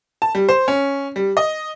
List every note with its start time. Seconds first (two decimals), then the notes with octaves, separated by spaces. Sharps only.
0.22 A5
0.35 G3
0.49 C5
0.68 C#4
1.16 G3
1.37 D#5